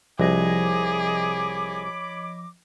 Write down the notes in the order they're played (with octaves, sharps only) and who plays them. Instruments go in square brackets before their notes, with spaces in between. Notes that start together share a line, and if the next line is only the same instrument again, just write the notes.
[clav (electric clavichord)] C2 [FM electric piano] F3 D#5 A#6 [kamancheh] G#4 [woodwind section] C#5 B5 D6